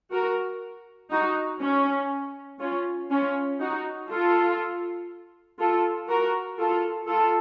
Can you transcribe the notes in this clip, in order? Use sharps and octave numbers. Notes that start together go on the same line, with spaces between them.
F#4 A#4
D#4 F#4
C#4
C#4 F4
C#4 F4
D#4 F#4
F4 A4
F4 A4
F#4 A#4
F4 A4
F4 A4